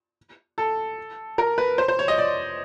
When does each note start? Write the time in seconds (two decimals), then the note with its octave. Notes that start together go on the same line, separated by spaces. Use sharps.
0.58 A4
1.38 A#4
1.58 B4
1.78 C5
1.88 C5
1.99 C#5
2.08 D#5
2.18 D5